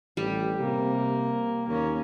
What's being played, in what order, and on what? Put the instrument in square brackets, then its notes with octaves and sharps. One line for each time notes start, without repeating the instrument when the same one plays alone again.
[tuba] A1 [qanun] G3
[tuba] C3 [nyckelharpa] A#3
[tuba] D#2 [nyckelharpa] A#3 C#4